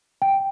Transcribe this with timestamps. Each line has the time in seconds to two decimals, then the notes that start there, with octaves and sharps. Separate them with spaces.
0.22 G5